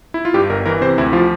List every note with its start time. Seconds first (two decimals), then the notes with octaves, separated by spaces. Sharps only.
0.14 E4
0.25 F4
0.34 G2 G4
0.50 G1 A#4
0.66 E3 A#4
0.81 C3 C5
0.98 D2 E4
1.13 F3 F4